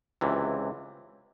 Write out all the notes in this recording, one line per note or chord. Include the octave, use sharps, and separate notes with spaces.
C#2 C3 E3